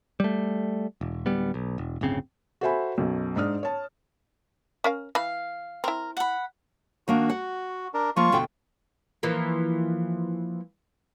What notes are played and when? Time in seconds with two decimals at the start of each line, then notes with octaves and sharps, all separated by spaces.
0.20 G3 A3
1.01 E1
1.26 D1 G3 B3
1.54 B1
1.78 E1
2.01 D1 G1 C#3 C4
2.61 F#4 A4 C5 E5 G#5 B5
2.98 B1 F#2 B2
3.36 G#2 D4 D5 D#6 F6
3.63 C#5 A5
4.84 C#4 A#4 F5
5.15 E3 F5 B5
5.84 C4 E4 A#4
6.17 F#5 B5
7.08 D#3 A#3 D4 F#4
7.30 F#5
7.94 D4 A#4
8.16 F3 A#3 F4 C#6
8.32 D2 B2 G5
9.23 E3 F3 A#3